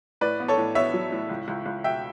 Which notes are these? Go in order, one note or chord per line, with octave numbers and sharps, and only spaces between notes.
A2 B4 D5
B3
A4 C#5
A2
B3 C#5 E5
F#3
A2
C#2
C#2
C#2
B2 E5 G5